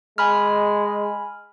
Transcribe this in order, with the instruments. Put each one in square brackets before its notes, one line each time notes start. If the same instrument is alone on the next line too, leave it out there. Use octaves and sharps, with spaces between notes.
[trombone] G#3 [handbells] G#5 B5 F6